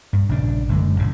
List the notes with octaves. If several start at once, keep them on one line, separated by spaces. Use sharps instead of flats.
G2
A#1 C#3 F3 D4
F1 F#2 D3 G#3
A#1 A2 C#3